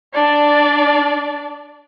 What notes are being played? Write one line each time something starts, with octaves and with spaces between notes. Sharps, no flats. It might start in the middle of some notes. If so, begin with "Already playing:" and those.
D4 D5